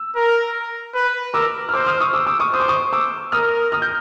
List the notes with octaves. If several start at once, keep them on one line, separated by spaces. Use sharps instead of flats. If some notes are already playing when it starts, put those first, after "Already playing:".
Already playing: E6
A#4
B4
A#4 D6 E6
F6
C5 D6 E6
D#6 F6
C#6 D#6
D6 E6
D6 E6
C#6 D#6
C5 D#6
D6
C#6 D#6
D6 E6
A#4 D#6 F6
D#6 F6
G6